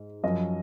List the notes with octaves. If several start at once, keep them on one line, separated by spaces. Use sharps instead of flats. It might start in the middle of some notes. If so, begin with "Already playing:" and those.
Already playing: G#2
F#2 F3 D#5